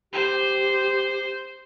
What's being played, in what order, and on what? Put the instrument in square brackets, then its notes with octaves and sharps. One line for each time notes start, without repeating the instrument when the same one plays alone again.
[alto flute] G4 [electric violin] C5